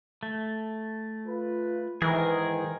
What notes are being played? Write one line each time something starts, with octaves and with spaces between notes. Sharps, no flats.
A3
F4 B4
G#2 D#3 E3 G#4 A#4